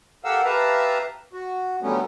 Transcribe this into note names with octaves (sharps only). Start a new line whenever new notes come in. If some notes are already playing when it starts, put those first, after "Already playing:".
G4 A4 A#4 F5 F#5 E6
G4 B4 E5 F5 A5 A#5
F#4
D3 F#3 G3 A3 B3 C#4